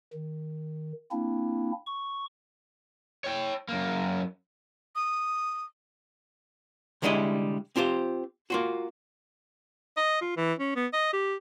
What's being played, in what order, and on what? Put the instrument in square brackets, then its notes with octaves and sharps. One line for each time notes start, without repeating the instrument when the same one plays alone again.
[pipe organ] D#3
A#3 C4 D4 E4
C#6
[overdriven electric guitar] C#5 G5
F#2 A#3
[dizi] D#6
[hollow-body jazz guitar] C2 D3 G3 G#3 E4 D#5
C4 F4 G4 C5
A#3 F4 F#4
[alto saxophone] D#5
F4
E3
C#4
B3
D#5
G4